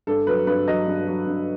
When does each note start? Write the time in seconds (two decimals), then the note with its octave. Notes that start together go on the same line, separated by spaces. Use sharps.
0.07 G2 A4
0.27 F#3 B4
0.47 G2 B4
0.67 F#3 D#5
0.88 G2
1.07 F#3
1.27 G2